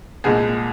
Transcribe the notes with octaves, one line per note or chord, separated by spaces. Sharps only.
C2 A#2 G#3 G#4